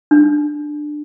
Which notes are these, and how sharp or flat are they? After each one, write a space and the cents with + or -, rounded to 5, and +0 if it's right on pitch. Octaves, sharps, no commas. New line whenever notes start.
D4 +15